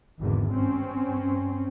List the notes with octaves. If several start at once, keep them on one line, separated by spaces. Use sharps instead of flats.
G#1 E2 D3 D#3
G2 C4 C#4